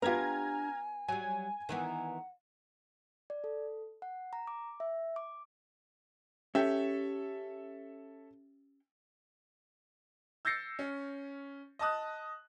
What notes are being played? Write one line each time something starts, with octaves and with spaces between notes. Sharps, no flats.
B3 D4 F4 G4 G#5 A#5 F6 G#6
F#3 G3 G#5
D#3 E3 B3 F#5
D5
A4
F#5
A#5
D6
E5
D6
C#4 G4 A4 C#5 E5 G5
E6 G6 A6 A#6 C7 C#7
C#4
D#5 A5 D#6 F#6